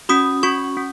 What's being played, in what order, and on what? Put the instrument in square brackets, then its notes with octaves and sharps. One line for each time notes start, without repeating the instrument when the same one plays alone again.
[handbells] C#4 F#4 D#6
C#4 F#4 C#6
C#4